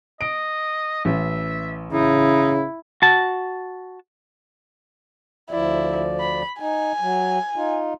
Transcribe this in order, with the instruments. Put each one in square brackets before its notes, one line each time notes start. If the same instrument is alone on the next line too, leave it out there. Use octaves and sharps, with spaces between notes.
[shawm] D#5 [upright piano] D7
[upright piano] A1 [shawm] E5
[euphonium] C#3 [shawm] D#4 [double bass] E4
[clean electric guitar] F#4 A5
[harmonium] D2 F3 D5 [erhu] E4
[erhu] B5
[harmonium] D#4 [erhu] G#5
[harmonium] F#3
D#4 F4